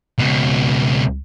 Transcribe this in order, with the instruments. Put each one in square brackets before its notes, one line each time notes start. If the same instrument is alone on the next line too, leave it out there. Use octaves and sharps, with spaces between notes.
[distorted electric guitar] C#2 B2